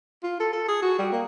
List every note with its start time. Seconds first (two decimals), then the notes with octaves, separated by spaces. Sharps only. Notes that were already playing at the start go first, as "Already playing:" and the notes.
0.23 F4
0.40 A4
0.53 A4
0.68 G#4
0.82 F#4
0.99 G3
1.12 A#3